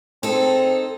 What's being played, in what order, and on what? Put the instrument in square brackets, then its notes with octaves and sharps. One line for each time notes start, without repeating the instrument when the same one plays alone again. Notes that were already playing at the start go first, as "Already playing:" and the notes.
[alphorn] C4 [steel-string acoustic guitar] D#4 G#4 A4